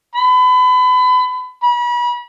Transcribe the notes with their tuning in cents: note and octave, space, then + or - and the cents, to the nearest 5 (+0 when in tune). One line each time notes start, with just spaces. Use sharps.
B5 +30
B5 -35